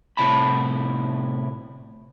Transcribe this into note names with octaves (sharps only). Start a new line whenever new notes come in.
A2 C3 D#3 E4 A5 B5